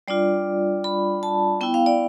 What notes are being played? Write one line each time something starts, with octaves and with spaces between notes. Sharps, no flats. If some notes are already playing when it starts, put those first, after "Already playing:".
G3 D4 F4 D5
B5
A5
B3 E4 G5
F5
D5